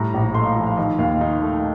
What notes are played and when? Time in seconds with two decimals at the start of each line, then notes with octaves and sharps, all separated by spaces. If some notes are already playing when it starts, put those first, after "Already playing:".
Already playing: A2 G3 A#5
0.14 A#1
0.35 A3 C6
0.41 D#5
0.45 F5
0.56 F3
0.67 F5
0.77 D#3 D#5
0.99 D#2 F5
1.21 D#4
1.42 A3